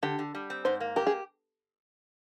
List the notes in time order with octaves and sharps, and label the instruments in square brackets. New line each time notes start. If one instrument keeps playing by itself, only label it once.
[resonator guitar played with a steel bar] D3 [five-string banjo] G4
[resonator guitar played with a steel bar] D3
G3
C4
[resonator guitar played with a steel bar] G#2 [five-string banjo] C5
[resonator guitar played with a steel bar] A#3
[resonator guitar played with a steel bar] G4 [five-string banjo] A#4
[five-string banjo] G#4